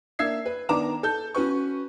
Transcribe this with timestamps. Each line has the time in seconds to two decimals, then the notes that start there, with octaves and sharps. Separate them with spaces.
0.19 A#3 D4 E5 E6 G#6 C7
0.46 B4
0.69 D#3 B3 D4 A#5 D6 E7
1.03 A4 A5 G6
1.35 C#4 F#4 B4 C#6